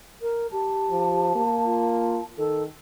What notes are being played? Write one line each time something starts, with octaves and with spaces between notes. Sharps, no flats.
A#4
G4 A5
F3
A#3
F4
D#3 A4